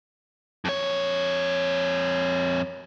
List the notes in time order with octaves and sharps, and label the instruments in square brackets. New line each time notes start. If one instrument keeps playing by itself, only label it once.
[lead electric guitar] F2 C#5